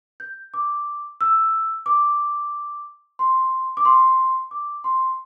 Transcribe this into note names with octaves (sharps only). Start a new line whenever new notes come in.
G6
D6
E6
D6
C6
D6
C6
D6
C6